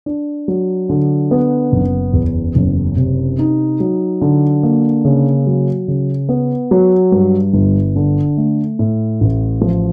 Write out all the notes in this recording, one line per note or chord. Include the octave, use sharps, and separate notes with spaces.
D4
F#3
D3
B3
F#1
E2
F#1
C3
D#4
F#3
D3
A#3
C#3
F#3
C#3
B3
F#3
G2
G1
D3
A3
A2
A1
F3